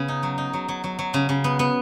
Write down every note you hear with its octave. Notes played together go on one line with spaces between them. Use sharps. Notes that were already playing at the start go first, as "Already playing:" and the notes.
Already playing: C#3 B3
D#4
F#3
D#4
F#3
F#3
F#3
F#3
C#3
C#3
B3
B3